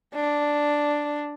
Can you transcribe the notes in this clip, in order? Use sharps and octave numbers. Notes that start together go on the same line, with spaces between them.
D4